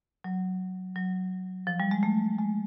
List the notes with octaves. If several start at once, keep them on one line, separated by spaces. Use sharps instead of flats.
F#3
F#3
F3
G3
G#3
A3
G#3